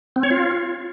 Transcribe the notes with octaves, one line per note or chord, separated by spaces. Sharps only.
C4
C#5
F4